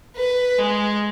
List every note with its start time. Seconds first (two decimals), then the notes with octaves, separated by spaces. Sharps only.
0.16 B4
0.58 G#3